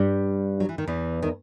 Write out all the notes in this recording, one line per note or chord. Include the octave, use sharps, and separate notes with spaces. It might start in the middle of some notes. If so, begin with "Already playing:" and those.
Already playing: G2 G3
F#3
E3
D#3
E2 E3
D#3